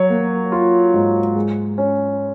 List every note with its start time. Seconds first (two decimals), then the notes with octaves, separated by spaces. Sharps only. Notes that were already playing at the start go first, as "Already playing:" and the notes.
Already playing: F#3 C#5
0.10 A#3
0.52 F4
0.94 G#2
1.35 G#3
1.78 C#4